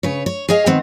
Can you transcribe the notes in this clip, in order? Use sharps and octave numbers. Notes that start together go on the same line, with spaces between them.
C#3 B4 C#5
C#5
G#4 C#5 D#5 F5
D#3 B3 C4